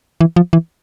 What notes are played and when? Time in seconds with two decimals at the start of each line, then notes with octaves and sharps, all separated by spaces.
0.21 E3
0.36 F3
0.53 E3